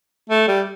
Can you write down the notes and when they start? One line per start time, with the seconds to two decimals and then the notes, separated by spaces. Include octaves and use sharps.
0.30 A3
0.48 G3